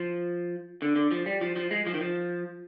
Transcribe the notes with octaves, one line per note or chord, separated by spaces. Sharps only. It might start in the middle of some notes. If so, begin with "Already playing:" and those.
Already playing: F3
D3
D3
F3
G3
F3
F3
G#3
F3
D#3
F3